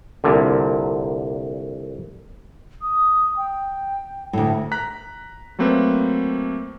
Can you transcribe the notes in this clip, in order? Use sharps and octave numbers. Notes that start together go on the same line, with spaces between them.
C2 A#2 D3
D#6
G5
D2 A2
A#5 F#6 B6
F#3 A3 A#3 C4 B4